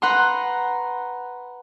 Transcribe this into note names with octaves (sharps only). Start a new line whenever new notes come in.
B4 F#5 A#5 C6